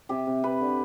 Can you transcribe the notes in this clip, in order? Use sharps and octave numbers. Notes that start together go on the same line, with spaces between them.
C3 G4
C3
C4 B4
D3